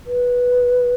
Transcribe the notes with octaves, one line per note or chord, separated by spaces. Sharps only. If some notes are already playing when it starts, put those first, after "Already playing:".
B4